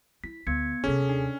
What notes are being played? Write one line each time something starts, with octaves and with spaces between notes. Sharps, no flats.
E4 B6
D2 B3 G#6 C#7
D#2 C3 C#4 G#4 A4
D4